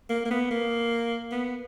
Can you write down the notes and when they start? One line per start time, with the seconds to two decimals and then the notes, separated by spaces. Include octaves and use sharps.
0.10 A#3
0.25 A#3
0.31 B3
0.51 A#3
1.32 B3